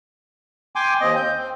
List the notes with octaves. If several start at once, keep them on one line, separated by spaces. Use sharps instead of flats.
G5 G#5 C6 D6
D#2 C4 D#5
G6
C4